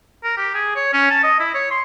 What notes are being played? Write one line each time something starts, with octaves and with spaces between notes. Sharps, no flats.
A#4
G4
G#4
C#5
C#4
A5
D#5
E4
C#5
C6